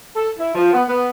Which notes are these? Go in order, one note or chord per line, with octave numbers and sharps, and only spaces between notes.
A4
E4
F3
B3
B3